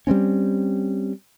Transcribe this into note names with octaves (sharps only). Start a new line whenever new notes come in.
G3 A3 C4 C#4